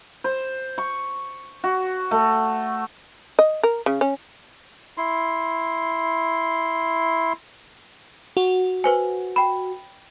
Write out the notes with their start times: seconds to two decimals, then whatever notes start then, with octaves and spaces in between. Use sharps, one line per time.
0.24 C5
0.78 C#6
1.64 F#4
2.11 A3
3.39 D#5
3.63 A#4
3.86 C#3
4.01 C#4
4.97 E4 C6
8.37 F#4
8.84 B4 C5 G#5
9.36 G5 B5